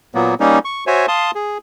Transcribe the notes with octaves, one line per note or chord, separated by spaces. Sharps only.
A#2 F#3 A#3 B3
G3 A#3 C#4 D#4
C#6
F#4 C5 C#5 E5 G#5
F5 A5 C6 D#6
G#4